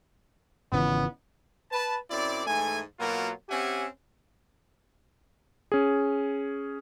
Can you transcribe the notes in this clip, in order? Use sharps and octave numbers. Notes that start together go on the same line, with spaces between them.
G#1 C#3 E3 B3
B4 A5
F#2 C4 E4 D5
G#2 E3 A3 G#5
B2 F#3 A#3 F4 F#4 A#4
C4 C#4 G4 E5 F#5 G#5
C#4 G#4